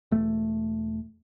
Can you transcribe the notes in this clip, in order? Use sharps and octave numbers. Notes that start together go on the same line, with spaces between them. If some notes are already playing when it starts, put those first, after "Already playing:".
E1 A3